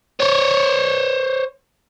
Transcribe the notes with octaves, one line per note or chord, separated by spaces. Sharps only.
C5 C#5